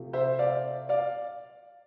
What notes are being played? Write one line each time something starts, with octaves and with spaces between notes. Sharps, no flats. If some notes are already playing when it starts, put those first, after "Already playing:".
Already playing: C3 F3 A3
C5 E5
D5 F5
D5 F5